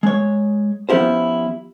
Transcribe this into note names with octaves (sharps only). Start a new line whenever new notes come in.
G#3 C#5
F3 B3 C#4 E4 G4 C5